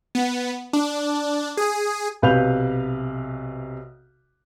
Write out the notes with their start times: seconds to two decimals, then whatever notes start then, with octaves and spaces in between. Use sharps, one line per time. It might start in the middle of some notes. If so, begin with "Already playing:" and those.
0.15 B3
0.73 D4
1.57 G#4
2.22 B1 C3 B4 F5 G6 F7